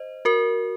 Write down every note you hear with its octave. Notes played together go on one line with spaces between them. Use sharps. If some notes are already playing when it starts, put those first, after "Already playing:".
Already playing: C5 D#5
F#4 A#4